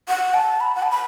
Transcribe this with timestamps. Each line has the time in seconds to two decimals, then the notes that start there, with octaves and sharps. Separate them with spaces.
0.09 F#5
0.34 A5
0.61 B5
0.75 F#5
0.83 A5
0.91 B5